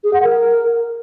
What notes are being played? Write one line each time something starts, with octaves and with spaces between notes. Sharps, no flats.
G#4
F#5
A#4